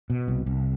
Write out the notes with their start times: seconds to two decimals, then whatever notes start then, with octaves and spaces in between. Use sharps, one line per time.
0.10 B2
0.28 C2
0.46 C2